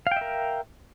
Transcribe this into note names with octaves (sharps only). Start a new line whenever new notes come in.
A#4 E5 F5 G5